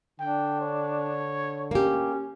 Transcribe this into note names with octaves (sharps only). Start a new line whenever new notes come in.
D3 D4 G5
C#5
A#3 C#4 G4